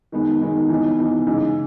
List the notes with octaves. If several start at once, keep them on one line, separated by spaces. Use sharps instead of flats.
D#3 G#3 B3 D#4
D#3 G#3 B3 D#4
E3 B3 D#4
E3 B3 D#4
C#3 E3 G#3 D#4